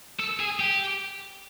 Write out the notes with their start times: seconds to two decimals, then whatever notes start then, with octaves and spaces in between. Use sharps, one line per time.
0.20 A4
0.40 G#4
0.60 G4